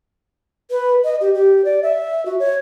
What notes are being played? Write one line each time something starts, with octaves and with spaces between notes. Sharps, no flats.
B4
D#5
G4
G4
D5
E5
F#4
C#5